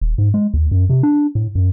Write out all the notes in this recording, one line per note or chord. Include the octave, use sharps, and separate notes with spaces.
D#1
G#2
G#3
D#2
F#2
C3
D4
A2
F#2